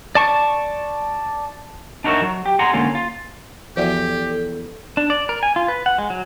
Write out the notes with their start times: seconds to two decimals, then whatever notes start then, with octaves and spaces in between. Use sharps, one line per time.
0.15 D5 A5 C#6
2.04 D4 D#4 F#4 A#4 C#5 E5
2.22 F#3
2.46 G4
2.59 G#4 F#5 A#5 C6
2.73 D3 G#3 A#3 C#4 F4
2.95 F4
3.77 E2 F3 F#4 G4 A4 D5
4.97 D4
5.10 D5
5.29 A#4
5.43 G#5
5.56 F4
5.68 B4
5.86 F#5
5.98 G#3
6.10 F#3